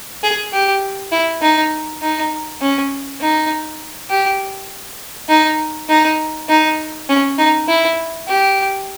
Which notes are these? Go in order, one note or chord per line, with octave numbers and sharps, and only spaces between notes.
G#4
G4
E4
D#4
D#4
C#4
D#4
G4
D#4
D#4
D#4
C#4
D#4
E4
G4